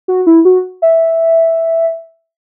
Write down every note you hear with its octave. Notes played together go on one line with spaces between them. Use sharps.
F#4
E4
F#4
E5